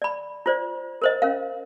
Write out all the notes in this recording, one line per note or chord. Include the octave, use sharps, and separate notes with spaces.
D5 B5
F4 C5 D5
A#4 C5 D#5
C#4 A#4 F5